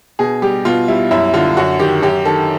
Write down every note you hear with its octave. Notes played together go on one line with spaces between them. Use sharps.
B2 G#4
G3 G4
B2 F4
G3 E4
F#2 E4
D3 F4
F#2 F#4
D#3 G4
F#2 G4
D#3 A4